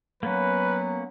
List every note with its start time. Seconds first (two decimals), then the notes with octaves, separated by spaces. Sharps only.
0.23 F#3 A#3 B3 C#4 B4